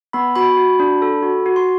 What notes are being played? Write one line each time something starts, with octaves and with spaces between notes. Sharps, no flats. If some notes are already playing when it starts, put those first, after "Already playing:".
B3 B5
F#4 B5
F#4
D4
A4
F#4
F#4
C6